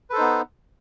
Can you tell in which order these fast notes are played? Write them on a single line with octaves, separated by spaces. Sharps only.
B4 A4 C5 D#4 B3